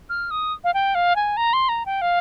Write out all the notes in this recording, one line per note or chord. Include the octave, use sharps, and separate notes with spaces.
F6
D#6
F5
G5
F5
G#5
A#5
C6
A#5
G5
F5